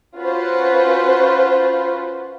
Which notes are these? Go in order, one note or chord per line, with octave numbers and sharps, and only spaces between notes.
C#4 F4 F#4 B4 C5